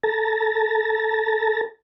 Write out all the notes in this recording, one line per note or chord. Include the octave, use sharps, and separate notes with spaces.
A4 A5 A#5